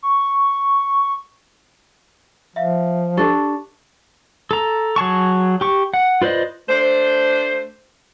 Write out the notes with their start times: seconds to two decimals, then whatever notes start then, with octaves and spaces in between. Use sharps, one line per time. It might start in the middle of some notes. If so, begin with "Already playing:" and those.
0.03 C#6
2.56 F3 E5 F5
3.17 D4 G4 A4 C#6
4.51 A4 A#5
4.96 F#3 G#4 A5 C#6
5.61 G4 C#6
5.94 F#5
6.22 F4 B4 C5 D5 D#5
6.69 A3 D4 C5